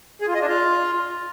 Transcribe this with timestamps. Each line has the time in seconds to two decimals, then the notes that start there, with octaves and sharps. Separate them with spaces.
0.22 G#4
0.28 F4
0.35 D#5
0.41 D4
0.48 F4